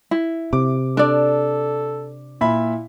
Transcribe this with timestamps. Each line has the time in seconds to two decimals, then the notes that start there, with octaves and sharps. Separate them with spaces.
0.11 E4
0.53 C3 D6
0.97 D4 A4 D5
2.41 A#2 E4 E5 B5